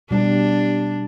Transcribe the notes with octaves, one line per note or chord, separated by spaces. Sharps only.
B2 G3 D4